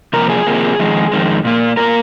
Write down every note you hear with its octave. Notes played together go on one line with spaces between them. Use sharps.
C3 F3 A#3 A#4
G#4
C3 F3 A#3
F2 D#3 G#3
F2 D#3 G#3
A#2 A#3
A#2 A#3 A#4